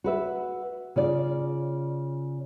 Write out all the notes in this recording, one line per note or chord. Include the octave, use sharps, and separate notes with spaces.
F#4 B4 E5
C#3 F4 D5